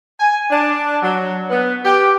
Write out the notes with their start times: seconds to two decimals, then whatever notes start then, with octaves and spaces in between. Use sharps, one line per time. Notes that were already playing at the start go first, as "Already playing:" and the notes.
0.20 G#5
0.50 D4
1.02 F#3
1.50 B3
1.85 G4